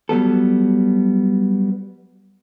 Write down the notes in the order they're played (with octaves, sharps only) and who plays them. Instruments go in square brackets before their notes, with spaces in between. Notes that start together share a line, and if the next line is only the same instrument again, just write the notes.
[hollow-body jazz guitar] F#3 G3 B3 A4